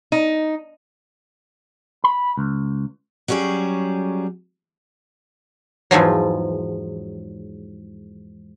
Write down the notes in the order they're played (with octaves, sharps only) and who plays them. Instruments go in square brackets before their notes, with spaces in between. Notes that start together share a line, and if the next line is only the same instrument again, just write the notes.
[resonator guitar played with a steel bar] D#4
[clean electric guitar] B5
C#2
[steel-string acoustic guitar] F#3 G3 C#4 G#4 D5
[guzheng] E2 G#2 F3 F#3